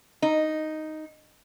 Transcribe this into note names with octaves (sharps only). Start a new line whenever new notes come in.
D#4